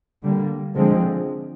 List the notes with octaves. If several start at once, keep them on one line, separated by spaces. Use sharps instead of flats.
D3 G3 A#3
D3 F3 G#3 C4